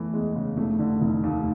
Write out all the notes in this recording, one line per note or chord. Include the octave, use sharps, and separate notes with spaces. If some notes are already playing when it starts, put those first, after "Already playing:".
Already playing: E2 E3 A3
E2 G#3
C#3
F1 A3
D3
F1
D#2